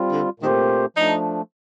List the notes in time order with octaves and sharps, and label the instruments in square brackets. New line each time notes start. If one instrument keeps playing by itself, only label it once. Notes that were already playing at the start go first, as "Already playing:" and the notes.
Already playing: [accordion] G3 C4 F4
[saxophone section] D3
[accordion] A#2 A3 C4 G4 C5 [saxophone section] D#3
[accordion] F3 A3 D4 [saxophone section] D#4